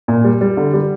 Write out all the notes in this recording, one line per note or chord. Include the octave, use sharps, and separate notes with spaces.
A#2
G3
G3
D3
G3